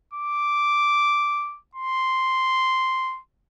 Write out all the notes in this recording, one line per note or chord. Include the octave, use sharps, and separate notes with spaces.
D6
C6